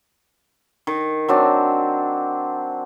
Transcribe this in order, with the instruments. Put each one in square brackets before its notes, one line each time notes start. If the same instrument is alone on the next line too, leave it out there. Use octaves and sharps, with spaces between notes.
[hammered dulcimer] D#3
F#3 C4 D4